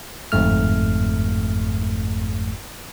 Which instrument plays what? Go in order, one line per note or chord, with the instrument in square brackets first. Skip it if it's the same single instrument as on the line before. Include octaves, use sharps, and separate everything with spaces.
[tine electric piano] G1 F2 G#2 A3 F6